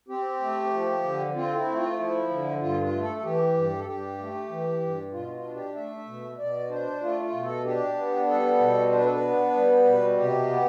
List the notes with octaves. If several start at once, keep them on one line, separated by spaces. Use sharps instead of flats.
C4 G4
A3
F3
D3
C4 F4
E4
A3
F4
F3 E4
D3
G2 F4
F4
A3
A4
A4
E3 G4
G2
A4
G2 G4
A3
E3
G2
B2 F4
F4
D4
G4
A3 E5
B2
B2 D5
D4 C5
A3 F4
F4
B2
A4
D4 G4
B3
G3 A4
B2
D4 C5
B4
A4
B4
B3
G3
B2
C3 G4
B3